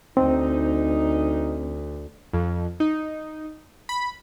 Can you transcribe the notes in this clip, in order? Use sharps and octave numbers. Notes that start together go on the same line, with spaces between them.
D2 C4 D#4
F2
D#4
B5